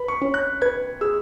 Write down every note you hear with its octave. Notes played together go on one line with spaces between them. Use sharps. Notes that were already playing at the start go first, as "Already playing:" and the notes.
Already playing: B4 B5
C#6
C#4
F#6
B4 G#6
G#4 E6